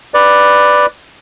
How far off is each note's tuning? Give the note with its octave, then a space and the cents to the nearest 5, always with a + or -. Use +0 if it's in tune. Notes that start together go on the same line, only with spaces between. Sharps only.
B4 +0 D5 +5